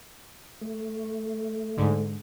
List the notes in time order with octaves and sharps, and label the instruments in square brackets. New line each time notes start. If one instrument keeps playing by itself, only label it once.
[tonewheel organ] A3
[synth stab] G#2 D3